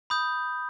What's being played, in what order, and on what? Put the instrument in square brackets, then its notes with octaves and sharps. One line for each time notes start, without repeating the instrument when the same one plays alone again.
[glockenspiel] B5 D#6 G6